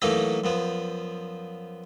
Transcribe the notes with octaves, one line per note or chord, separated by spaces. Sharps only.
E3 F#3 A3 A#3 D#4 E4
F#2 F3 B3